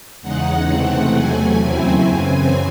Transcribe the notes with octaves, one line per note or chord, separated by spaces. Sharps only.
E2 C#3 G#3 D#4 F#5
C3 E3 A3 C4 F#5
E2 C3 F#3 A3 G#5
D#2 C#3 F#3 C4 E4
F#2 C#3 E3 C4